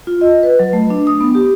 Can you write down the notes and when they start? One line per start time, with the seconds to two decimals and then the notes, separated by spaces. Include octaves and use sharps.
0.07 F4
0.21 D#5
0.43 B4
0.59 F#3
0.73 A3
0.90 D4
1.07 D#6
1.21 B3
1.35 G4